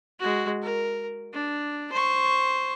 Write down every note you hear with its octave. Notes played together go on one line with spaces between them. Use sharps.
G#3 F#4
A#4
D4
C5 C#6